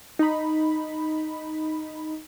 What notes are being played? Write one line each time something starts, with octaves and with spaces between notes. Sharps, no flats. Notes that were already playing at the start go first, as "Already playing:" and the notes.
D#4 B5